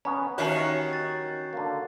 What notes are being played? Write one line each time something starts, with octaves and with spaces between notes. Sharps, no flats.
B3 C#4 A#5
D#2 D#3 C#4 F#4 E5 A5 F#6 C7
A6
D3 A#3